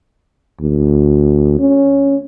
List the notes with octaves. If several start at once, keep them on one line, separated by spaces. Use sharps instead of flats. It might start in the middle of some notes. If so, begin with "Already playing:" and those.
D2
C#4